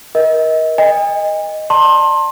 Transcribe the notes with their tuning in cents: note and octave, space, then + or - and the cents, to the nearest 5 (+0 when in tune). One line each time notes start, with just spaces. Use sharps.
A#4 +35 D#5 +30
D#5 +0 G#5 -45
D5 +20 A5 +35 C6 +30